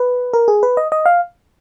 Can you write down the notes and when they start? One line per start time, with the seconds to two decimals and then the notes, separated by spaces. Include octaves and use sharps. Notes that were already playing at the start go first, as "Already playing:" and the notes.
Already playing: B4
0.33 A#4
0.48 G#4
0.63 B4
0.77 D#5
0.92 D#5
1.06 F5